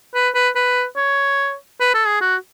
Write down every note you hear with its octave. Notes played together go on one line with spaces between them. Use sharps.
B4
B4
B4
C#5
B4
A4
G#4
F#4